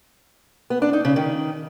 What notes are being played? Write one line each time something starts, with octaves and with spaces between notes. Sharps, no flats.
B3
D4
D#4
C#3
D#3